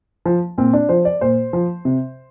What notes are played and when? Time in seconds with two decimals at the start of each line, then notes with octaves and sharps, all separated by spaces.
0.26 F3
0.58 A#2 C4
0.73 D4
0.89 F3 C5
1.05 D5
1.21 A#2 C5
1.53 F3
1.85 C3